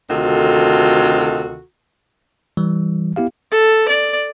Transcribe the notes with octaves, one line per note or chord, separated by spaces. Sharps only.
D2 C3 D#3 F4 F#4 A4
E3 G3
B3 E4 G4 F5
A4
D5